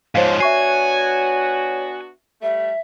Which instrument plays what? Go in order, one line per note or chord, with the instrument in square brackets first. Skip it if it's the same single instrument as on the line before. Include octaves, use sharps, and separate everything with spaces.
[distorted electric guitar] G#2 F3 [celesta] C5 F5 [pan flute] C#5
[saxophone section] B3 D4 F#4 [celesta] E5 C#6 C7 [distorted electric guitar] G#5
[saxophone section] G3 A3 [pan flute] E5